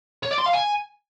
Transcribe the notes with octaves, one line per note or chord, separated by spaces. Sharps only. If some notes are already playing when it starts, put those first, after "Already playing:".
C#5
D5
C6
F5
G#5